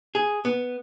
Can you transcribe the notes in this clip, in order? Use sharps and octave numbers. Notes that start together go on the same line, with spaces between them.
G#4
B3